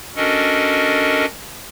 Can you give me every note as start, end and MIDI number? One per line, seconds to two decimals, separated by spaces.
0.16 1.25 61
0.16 1.25 62
0.16 1.25 66
0.16 1.25 69
0.16 1.25 70
0.16 1.25 75